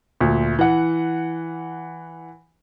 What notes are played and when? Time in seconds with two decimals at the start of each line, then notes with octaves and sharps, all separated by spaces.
0.21 D2 A#2
0.59 E3 F#5